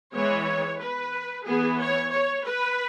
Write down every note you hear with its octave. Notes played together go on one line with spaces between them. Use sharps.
E3 G#3 B3 C#5
B4
E3 B3 G#4
C#5
C#5
B4